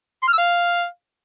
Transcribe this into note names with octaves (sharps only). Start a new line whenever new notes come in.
C6
F6
E6
F5